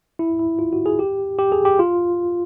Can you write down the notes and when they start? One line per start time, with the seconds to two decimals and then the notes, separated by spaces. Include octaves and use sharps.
0.19 E4
0.39 E4
0.59 F4
0.73 F#4
0.86 G#4
0.99 G4
1.39 G4
1.52 G#4
1.65 G4
1.79 F4